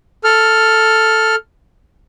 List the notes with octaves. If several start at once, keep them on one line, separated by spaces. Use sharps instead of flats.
A4 F6